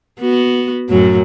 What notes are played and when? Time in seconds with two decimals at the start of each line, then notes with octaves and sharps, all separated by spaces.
0.20 B3 F#4
0.89 F#2 A2 F#3